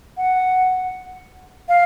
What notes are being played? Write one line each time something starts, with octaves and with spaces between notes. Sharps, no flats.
F#5
F5